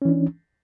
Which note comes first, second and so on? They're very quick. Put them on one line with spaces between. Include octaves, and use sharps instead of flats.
C#4 E3 D4